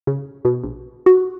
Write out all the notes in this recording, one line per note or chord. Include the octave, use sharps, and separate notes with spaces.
C#3
B2
A#1
F#4